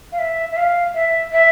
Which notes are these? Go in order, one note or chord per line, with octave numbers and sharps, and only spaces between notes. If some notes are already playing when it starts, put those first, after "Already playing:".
F5
E5
E5
F5
E5
E5